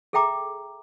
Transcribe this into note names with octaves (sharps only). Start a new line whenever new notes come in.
G#4 A4 E5 G5 A#5 D6